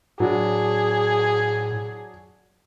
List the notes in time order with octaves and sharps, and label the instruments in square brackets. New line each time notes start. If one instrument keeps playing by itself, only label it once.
[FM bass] A2 [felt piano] F#3 D4 [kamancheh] G#4